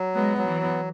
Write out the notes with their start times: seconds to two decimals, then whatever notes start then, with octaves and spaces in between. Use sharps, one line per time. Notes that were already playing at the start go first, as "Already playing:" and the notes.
Already playing: F#3
0.15 G#3 B3
0.38 F#3
0.46 E3
0.62 B3